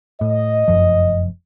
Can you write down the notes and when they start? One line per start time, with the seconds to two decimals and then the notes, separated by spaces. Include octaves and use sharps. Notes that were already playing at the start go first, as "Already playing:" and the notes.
0.21 A2 D#5
0.68 F1 F#2 F3